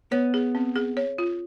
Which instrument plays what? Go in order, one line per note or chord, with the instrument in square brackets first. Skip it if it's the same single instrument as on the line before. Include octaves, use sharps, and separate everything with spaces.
[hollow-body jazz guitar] B3 [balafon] C#5
[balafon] G#4
C4
G#4
C#5
F4